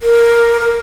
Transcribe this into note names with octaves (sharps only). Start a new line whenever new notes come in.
A#4
A#4